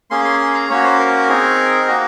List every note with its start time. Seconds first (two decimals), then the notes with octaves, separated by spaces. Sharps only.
0.10 A#3 C#4 G#4 C6
0.25 C6
0.40 C6
0.54 A#5
0.69 A#3 C#4 F#4 C#5
0.84 C5
0.99 A#4
1.29 C4 D#4 G#4
1.88 A#3 D#4 F#4 D#5